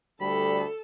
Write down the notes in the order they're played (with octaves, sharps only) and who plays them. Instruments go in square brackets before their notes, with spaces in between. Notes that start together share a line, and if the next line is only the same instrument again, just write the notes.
[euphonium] D2 [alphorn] G3 [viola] A4 [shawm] B5